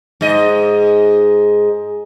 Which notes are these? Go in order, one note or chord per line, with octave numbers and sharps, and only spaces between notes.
G#2 D#5